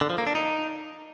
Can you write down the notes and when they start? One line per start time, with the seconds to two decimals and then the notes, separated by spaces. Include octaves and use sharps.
0.01 D3
0.10 F3
0.18 A#3
0.27 D4
0.35 D#4